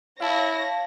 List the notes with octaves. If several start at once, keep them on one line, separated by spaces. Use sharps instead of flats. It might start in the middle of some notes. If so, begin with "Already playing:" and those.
E4 C#5 F5 A5 A#6